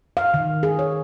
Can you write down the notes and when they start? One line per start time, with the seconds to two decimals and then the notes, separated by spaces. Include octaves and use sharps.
0.17 F5
0.34 D#3
0.63 G#4
0.79 C#5